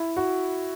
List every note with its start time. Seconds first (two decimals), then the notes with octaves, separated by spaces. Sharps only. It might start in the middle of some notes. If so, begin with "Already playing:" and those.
Already playing: E4
0.17 F#4